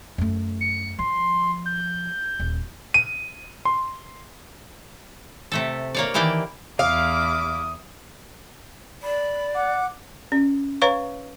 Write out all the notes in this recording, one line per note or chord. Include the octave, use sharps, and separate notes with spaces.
F#2 A3
C#7
F3 C6
G6
D#1
D#7
C6
C3 A3 A4
A#3 C#5 D5
D#3 E3 A#3 G4 D5
E2 E4 F5 D6 D#6
D5 B5
F#5 D6
C#4
B4 C#5 F5 A#5 C#6